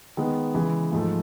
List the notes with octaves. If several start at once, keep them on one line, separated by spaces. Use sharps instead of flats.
D#3 G#3 B3
C#3 E3 G#3
G#2 F3 A3